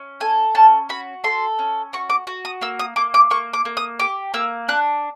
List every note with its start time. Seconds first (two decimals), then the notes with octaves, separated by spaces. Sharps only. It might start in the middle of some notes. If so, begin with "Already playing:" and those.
Already playing: C#4
0.20 A4 G#5
0.55 C#4 A5
0.89 F#4 B5
1.24 A4 C6
1.59 C#4
1.93 F#4 C#6
2.10 D6
2.27 F#4
2.45 D#6
2.61 A#3 E6
2.79 D#6
2.96 A#3 D6
3.14 D6
3.30 A#3 C#6
3.53 D6
3.65 A#3
3.77 D#6
3.99 G4 D6
4.34 A#3 E6
4.68 D4 F#6